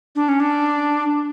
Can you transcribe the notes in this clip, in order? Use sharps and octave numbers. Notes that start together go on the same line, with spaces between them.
D4
C#4
D4